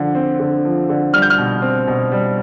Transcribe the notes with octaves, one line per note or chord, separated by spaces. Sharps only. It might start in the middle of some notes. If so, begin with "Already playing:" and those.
Already playing: D3 F3
C4
D3
F3
D3
G3 F6
G6
F6
B2
C4
B2
G3